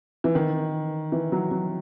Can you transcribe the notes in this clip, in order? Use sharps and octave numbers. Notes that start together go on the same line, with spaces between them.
E3
D#3
E3
F#3
F#3